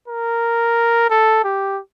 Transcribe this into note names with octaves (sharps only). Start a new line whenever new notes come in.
A#4
A4
G4